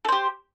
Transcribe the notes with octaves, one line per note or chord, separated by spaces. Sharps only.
G4 A4 C5